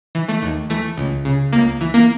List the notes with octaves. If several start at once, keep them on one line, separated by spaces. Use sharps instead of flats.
E3
A3
D#2
E3 A3
C#2
C#3
C#2 A#3
E3
A#3